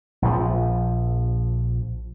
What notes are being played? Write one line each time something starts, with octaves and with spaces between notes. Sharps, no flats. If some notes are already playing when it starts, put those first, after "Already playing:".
A#1 F3